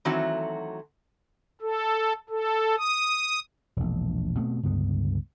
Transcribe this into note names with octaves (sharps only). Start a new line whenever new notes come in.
D#3 E3 F#3 A3 C4 F#4
A4
A4
D#6
E1 A#1
B2 A3 B3 C4
C#2 G2 D3 B3